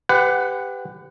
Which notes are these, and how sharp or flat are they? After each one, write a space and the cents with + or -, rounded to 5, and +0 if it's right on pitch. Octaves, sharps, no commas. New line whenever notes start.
G4 +15 B4 +30 F#5 +0